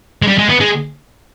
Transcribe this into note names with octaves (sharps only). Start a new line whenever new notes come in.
G#3
G3
G#3
B3
G#3